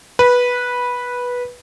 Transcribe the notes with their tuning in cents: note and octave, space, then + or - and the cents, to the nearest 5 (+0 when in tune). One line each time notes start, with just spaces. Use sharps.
B4 -10